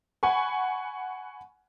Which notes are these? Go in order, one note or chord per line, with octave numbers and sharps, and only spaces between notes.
F#5 G#5 B5 C#6